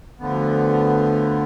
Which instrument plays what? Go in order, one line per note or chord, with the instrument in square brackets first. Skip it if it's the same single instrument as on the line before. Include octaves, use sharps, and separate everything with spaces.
[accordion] D2 D3 F3 B3